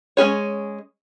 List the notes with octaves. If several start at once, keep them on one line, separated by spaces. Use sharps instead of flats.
G#3 C#4 G#4 C#5